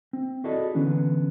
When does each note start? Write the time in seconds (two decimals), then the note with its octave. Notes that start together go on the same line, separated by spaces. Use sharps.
0.13 C4
0.44 E4 F#4 G#4 A4 D5 D#5
0.75 D3 E3 B3 C#4